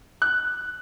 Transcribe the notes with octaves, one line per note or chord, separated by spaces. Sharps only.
F#6